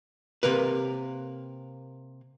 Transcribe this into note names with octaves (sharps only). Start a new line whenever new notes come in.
C3 A#3 A#4 B4